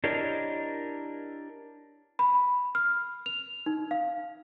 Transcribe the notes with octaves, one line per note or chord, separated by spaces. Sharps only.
D4 E4 G4 A#4 C#5 D#5
B5
F6
F7
D#4
F5